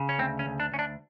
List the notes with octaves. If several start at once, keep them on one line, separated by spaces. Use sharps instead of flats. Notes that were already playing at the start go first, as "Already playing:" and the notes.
Already playing: C#3
C#4
D2 C4
C#4
D2
D4
D2 C#4
D4